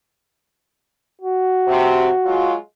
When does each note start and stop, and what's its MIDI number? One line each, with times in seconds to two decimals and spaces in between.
1.21 2.51 66
1.66 2.08 48
2.24 2.54 54
2.24 2.54 56
2.24 2.54 65